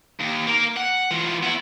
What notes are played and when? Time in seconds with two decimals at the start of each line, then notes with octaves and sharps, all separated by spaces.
0.21 D#2
0.47 A#3 A#4
0.77 F#5
1.11 E3 F4
1.43 B3 E4